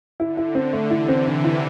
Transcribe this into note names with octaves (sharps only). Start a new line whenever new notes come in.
D3 E4
E4
C4
A3
C3 E3 E4
C4
D3
E4